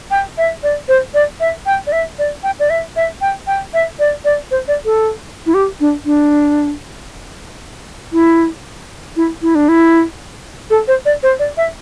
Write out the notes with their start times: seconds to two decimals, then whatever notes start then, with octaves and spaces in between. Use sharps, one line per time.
0.11 G5
0.38 E5
0.63 D5
0.88 C5
1.14 D5
1.40 E5
1.66 G5
1.87 D5
1.92 E5
2.19 D5
2.43 G5
2.60 D5
2.70 E5
2.96 E5
3.21 G5
3.47 G5
3.74 E5
3.99 D5
4.25 D5
4.51 C5
4.68 D5
4.85 A4
5.46 E4
5.54 G4
5.80 D4
6.06 D4
8.13 E4
9.16 E4
9.42 E4
9.55 D4
9.69 E4
10.70 A4
10.88 C5
11.05 D5
11.23 C5
11.39 D5
11.57 E5